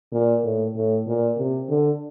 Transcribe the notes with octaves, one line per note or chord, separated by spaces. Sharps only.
A#2
A2
A2
A#2
C3
D3